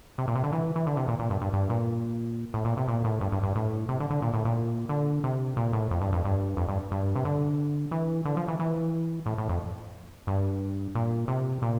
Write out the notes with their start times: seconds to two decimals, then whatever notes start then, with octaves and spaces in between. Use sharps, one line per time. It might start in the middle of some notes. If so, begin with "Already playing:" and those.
0.18 C3
0.28 A#2
0.35 C3
0.44 D3
0.52 E3
0.76 E3
0.86 D3
0.97 C3
1.08 A#2
1.19 A#2
1.30 G2
1.42 G2
1.53 G2
1.69 A#2
2.54 A2
2.65 A#2
2.77 C3
2.88 A#2
3.04 A2
3.21 G2
3.32 G2
3.43 G2
3.56 A2
3.89 C3
4.00 D3
4.10 D3
4.22 A#2
4.34 A2
4.45 A#2
4.89 D3
5.24 C3
5.57 A#2
5.73 A2
5.91 F2
6.01 G2
6.12 F2
6.25 G2
6.57 F2
6.69 G2
6.92 G2
7.16 C3
7.25 D3
7.91 E3
8.25 D3
8.37 F3
8.48 E3
8.59 E3
9.26 A2
9.38 A2
9.49 F2
10.27 G2
10.95 A#2
11.28 C3
11.62 A#2